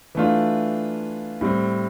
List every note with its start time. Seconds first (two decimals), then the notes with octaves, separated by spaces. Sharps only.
0.15 E3 A3 D4 F4
1.41 A2 G3 C4